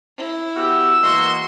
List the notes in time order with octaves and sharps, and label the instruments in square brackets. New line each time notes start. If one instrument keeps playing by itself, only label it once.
[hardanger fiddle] E4
[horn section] B3 F#4 G4 [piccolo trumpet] E6
[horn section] E3 G#3 A#3 [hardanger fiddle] F#4 C6